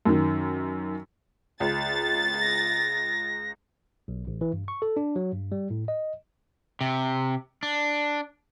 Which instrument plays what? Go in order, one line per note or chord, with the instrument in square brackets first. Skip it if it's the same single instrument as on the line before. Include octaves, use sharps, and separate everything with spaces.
[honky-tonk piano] F#2 D#3
[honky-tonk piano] C#2 [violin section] A6
[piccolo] A#6
[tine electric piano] B1
A1
E3
G2
C#6
A4
D4
F#3
G2
G3
A2
D#5
[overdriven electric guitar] C3
D4